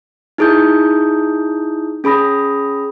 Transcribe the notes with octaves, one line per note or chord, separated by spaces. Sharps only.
D#4 E4 G#4 D#6 G6
C#4 G#4 B5 D#6 A#6